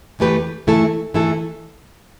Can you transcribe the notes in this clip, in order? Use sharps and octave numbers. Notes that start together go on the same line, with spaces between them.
E2 E3 A3 G4 B4
E3 A3 E4 A4
E3 A3 E4 A4